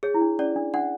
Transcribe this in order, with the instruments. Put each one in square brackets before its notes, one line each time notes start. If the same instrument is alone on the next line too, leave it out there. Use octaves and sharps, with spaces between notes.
[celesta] G#4 [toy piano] C#5
[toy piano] E4
D4
[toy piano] C#4 [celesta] D5
[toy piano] D4
[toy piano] D4 [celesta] F#5